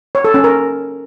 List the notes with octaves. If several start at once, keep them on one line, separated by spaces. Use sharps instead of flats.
C#5
A4
C#4
A#4